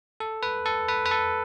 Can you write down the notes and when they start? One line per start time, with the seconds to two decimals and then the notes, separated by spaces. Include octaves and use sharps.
0.20 A4
0.43 B4
0.66 A4
0.88 B4
1.06 B4
1.11 A4